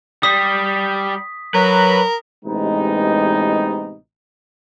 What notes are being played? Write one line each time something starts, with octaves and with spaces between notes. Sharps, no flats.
G3 D#6 B6
F#3 A#4 B4
A1 C3 G#3 B3 D#4